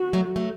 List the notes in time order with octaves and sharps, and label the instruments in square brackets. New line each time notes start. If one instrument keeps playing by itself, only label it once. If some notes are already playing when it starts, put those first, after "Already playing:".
Already playing: [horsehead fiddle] F#4
[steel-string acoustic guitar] F#3 A3
F#3 A3